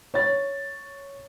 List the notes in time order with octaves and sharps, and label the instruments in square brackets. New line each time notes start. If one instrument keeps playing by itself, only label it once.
[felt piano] C#5 A6